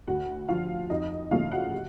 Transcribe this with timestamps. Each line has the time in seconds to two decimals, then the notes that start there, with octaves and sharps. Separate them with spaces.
0.07 D2 F#4 F#5
0.48 D3 F3 F4 F5
0.90 F2 D#4 D#5
1.31 C#3 E3 A3 F4 F5
1.52 F#4 F#5
1.72 C3